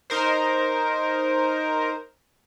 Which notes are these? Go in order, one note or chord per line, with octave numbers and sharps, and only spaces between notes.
D#4 A#4 C5